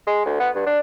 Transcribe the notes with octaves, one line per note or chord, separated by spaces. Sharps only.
G#3
D2
B3
G2
D4